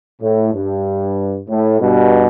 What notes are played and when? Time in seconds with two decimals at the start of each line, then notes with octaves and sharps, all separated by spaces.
0.22 A2
0.54 G2
1.48 A2
1.80 G2 B2